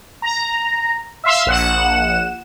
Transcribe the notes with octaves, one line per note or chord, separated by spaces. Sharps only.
A#5
E5 F5 C6 E6
A#1 F#5 E7